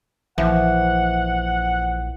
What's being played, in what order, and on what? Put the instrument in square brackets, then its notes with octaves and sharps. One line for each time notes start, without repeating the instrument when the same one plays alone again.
[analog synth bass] A#1 [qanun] E3 [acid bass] F3 [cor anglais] F#5